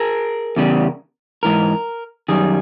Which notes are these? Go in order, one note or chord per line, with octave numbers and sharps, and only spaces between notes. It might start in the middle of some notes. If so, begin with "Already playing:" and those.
Already playing: G#4 A#4
E2 C#3 G3
G#2 E3 A#4
F#2 D#3 G3 G#4